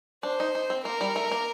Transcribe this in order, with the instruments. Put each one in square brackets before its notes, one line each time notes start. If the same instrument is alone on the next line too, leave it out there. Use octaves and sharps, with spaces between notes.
[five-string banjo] D4 [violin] C5
[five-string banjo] D#4
D#4
C4
[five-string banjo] A#3 [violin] A#4
[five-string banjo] G3
A3
A#3